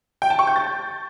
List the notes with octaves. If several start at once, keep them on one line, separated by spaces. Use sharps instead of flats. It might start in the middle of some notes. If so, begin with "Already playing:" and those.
G5
A5
C#6
G6
A6